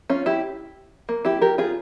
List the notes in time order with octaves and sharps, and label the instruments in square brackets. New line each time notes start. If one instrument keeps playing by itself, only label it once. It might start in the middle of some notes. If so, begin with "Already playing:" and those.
[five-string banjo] C#4 F4
E4 G4
A#3
E4 G4
G4 A#4
F4 G#4